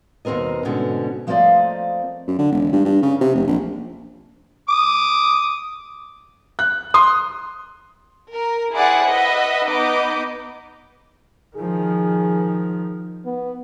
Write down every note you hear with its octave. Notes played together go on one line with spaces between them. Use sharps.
D#2 B2 A#3 C4 A#4 D#5
G#2 B2 D3 C4 C#4
F3 A3 A#3 C4 D5 D#5
F#2
D3
E1
G2
G2
C#3
C3
F1
A#1
D6 D#6
F#6
C6 D#6
A#4
E4 G#4 C5 D5 F#5
B4 D#5 E5 F#5
B3 D#4 D#5 B5 D6 G6
D#3 F3 G#4
B3